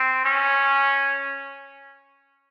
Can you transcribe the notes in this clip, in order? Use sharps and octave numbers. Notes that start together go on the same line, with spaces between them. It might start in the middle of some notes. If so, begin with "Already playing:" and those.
Already playing: C4
C#4